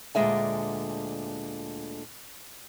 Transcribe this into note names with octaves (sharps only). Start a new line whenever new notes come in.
D2 A#2 D3 G#3 E5 G#5